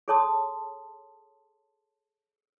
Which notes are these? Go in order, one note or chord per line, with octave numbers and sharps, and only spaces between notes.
G#4 A4 C#5 A5 C6 D#6